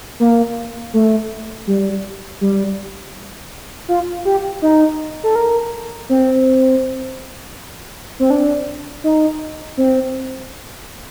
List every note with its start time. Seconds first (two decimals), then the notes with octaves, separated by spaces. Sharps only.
0.20 A#3
0.94 A3
1.67 G3
2.41 G3
3.88 F4
4.25 G4
4.62 D#4
5.23 A4
5.36 A#4
6.09 C4
8.20 C4
8.30 D4
9.04 D#4
9.77 C4